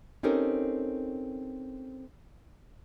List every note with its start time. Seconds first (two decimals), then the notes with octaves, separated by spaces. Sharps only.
0.23 C4 C#4 D#4 G4 A4 A#4